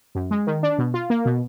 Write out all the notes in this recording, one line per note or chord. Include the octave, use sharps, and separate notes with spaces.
F#2
G#3
D#3
D4
B2
F4
A#3
B2